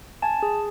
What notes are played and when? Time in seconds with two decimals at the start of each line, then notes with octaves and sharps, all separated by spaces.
0.22 G#5 A5
0.43 G#4